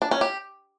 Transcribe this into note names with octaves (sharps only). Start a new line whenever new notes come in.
D4
C#4
G4